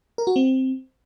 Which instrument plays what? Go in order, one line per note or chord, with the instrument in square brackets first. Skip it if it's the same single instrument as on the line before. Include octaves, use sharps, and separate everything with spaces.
[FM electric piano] A#4
F#4
C4